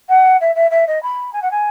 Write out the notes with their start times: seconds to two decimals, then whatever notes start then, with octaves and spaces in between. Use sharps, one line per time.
0.09 F#5
0.40 E5
0.55 E5
0.70 E5
0.87 D#5
1.03 B5
1.33 G#5
1.42 F#5
1.51 G#5